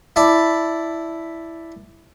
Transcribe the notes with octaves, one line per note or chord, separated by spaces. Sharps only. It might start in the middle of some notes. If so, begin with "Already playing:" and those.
E4 D5 A5 B5